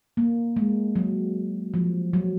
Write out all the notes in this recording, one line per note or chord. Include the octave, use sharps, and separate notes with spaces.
A#3
G#3
F#3
F3
F#3